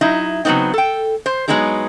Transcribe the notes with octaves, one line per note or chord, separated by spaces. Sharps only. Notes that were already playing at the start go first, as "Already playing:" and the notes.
F#3 D#4 E4
C#3 F#3 G3 B3 C4 D#4
A4 G5
C5
F#3 G#3 B3 D#4 E4 G#4